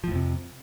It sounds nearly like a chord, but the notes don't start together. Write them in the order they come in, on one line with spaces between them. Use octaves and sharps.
F3 A2 F2 C3